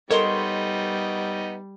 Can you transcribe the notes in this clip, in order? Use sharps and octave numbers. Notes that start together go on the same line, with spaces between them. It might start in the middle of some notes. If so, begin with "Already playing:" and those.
G3 B3 D#4 A4 A#4 C#5 D#5 C6